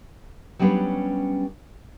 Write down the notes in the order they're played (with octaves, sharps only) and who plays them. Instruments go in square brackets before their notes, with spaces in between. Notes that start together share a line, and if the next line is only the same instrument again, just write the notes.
[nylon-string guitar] F#3 G3 B3 C#4 D4 B4